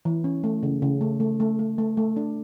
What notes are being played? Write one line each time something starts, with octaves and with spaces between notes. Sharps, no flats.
E3
C#4
A3
C#3
C#3
A3
A3
A3
A3
A3
A3
D4